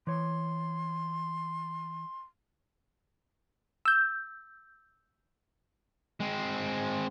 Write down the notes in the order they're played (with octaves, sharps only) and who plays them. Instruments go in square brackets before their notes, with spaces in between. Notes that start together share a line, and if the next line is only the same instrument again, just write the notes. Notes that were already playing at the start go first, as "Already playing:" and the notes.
[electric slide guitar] E3 C#5 [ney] C6
[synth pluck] E6 G6
[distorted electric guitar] G#3 C4